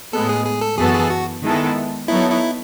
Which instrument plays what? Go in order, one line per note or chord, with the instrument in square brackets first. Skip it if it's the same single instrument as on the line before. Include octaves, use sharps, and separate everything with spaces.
[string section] A2 G#3 B3 [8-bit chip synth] A4
[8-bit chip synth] G#4
G#4
A4
[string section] F#2 E3 B3 F#4 A4 [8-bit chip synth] G#4
[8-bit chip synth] G#4
F#4
[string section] D#3 G#3 B3 E4 A4
[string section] F#3 B3 D#4 A4 C#5 [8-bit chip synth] E4
[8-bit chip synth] E4